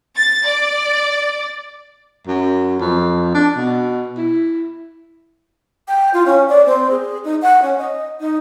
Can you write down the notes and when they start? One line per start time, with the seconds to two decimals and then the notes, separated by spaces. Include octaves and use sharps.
0.17 A6
0.47 D5
2.27 F#2
2.80 F2
3.35 D4
3.56 B2
4.17 E4
5.88 G5
6.13 F4
6.25 C#4
6.48 D5
6.65 C4
6.90 G#4
7.24 D#4
7.41 F#5
7.62 C#4
7.78 D#5
8.20 D#4